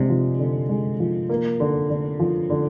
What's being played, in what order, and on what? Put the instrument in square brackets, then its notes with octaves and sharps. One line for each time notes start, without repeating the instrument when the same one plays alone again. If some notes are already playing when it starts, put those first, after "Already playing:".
Already playing: [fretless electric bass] C3 [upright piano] G#3 D4
[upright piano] F3
D3
G#3
F3
A#3
D3
D3
F3
D3